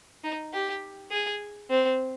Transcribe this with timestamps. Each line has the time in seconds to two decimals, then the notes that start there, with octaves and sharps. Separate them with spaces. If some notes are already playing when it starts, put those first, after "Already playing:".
0.24 D#4
0.53 G4
1.11 G#4
1.70 C4